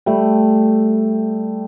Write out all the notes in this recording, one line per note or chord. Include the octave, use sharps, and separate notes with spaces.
G3 A3